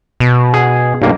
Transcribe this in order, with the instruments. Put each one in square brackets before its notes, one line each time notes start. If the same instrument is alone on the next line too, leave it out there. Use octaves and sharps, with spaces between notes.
[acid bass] B2
[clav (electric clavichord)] G#4
B1 G2 A#3